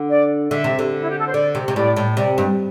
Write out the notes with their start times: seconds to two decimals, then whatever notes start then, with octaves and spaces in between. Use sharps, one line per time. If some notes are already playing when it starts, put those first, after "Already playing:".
Already playing: D3
0.10 D5
0.51 D3 E5
0.64 C3
0.79 D3
1.01 E4
1.09 G4
1.18 A4
1.26 C5
1.34 D3 D5
1.55 C3
1.68 C3
1.76 A2 D5
1.96 A2
2.17 C3 D5
2.38 G2